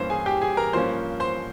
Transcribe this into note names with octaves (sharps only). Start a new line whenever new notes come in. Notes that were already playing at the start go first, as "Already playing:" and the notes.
Already playing: G2 E3 A#3 C#4 C5
G#4 G#5
G4 G5
G#4 G#5
A#4 A#5
G2 F3 A#3 C#4 C5 C6
C5 C6